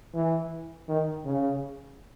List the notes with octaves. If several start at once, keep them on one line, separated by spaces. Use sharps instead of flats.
E3
D#3
C#3